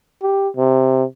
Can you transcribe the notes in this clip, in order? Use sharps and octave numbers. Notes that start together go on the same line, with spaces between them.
G4
C3